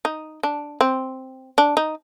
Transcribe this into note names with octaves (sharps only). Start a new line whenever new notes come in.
D#4
D4
C4
D4
D#4